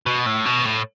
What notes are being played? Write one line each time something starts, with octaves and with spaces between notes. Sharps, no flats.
B2
A2
B2
A2